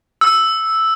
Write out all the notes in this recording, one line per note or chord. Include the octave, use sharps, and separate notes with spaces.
E6